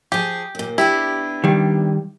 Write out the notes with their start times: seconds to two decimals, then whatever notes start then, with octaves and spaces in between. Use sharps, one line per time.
0.12 F3 G4 G#4
0.55 D#2 A#2
0.78 B3 D4 E4 G4
1.44 D#3 G3